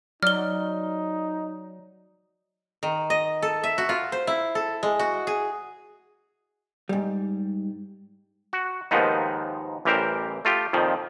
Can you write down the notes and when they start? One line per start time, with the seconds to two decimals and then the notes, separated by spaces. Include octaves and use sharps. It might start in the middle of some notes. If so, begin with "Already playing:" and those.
0.23 F#3 D#4 D5 F6 G7
2.83 D#3
3.10 D#5
3.42 A4
3.64 E5
3.78 F#4
3.89 F4
4.12 C5
4.27 E4
4.55 A4
4.83 G#3
4.99 F#4
5.27 G#4
6.89 G#2 G3
8.53 F#4
8.91 D#2 G#2 D#3 F3 B3 D#4
9.85 A1 E3 G3 G4 A#4 C5
10.45 A3 F4 G4
10.73 F2 A#2 D#3 F3